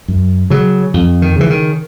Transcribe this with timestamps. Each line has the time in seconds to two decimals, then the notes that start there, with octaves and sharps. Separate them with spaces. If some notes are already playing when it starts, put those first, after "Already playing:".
0.08 F#2
0.50 C#3 F#3
0.94 F2
1.22 D#3
1.36 C#3 E3
1.50 D#3